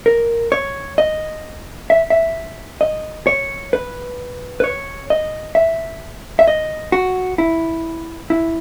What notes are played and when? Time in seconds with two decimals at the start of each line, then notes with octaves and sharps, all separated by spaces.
0.06 A#4
0.52 C#5
0.98 D#5
1.90 E5
2.10 E5
2.81 D#5
3.27 C#5
3.73 B4
4.60 B4
4.64 C#5
5.10 D#5
5.55 E5
6.39 E5
6.47 D#5
6.92 F#4
7.38 E4
8.30 E4